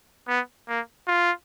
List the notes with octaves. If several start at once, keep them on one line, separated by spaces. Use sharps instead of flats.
B3
A#3
F4